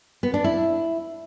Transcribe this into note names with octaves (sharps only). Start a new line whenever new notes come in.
B3
D4
E4